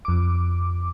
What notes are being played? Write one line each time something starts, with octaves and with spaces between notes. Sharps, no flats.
F2 D6